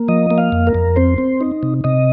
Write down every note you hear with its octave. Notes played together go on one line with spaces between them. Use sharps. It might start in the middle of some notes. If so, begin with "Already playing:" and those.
Already playing: A#3
F3 D#5
A#3
F5
F2
A#4
F2
C4 C5
C4
D#4
C3
C3 D#5